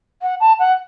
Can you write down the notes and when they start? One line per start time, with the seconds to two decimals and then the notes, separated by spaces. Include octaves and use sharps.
0.22 F#5
0.40 A5
0.59 F#5